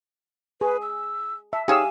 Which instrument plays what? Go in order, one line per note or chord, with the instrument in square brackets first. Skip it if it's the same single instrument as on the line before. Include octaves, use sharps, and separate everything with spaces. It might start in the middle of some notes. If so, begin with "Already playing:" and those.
[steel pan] G#4 [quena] B4
[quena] E6
[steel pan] E5 [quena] A5
[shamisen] D#4 G#4 C#5 [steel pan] G4 F5 E6 [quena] G#5